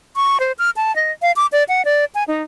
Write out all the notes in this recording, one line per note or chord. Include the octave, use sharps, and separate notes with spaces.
C#6
C5
F6
A5
D#5
F5
D6
D5
F#5
D5
G#5
D#4